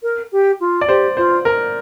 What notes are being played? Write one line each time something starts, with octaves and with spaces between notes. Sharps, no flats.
A#4
G4
F4
D5
G4 C5
F4 C5
A#4